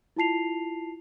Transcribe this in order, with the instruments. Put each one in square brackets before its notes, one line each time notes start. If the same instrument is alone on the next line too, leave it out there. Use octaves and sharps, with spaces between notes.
[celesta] E4 F4 A5 C7 F7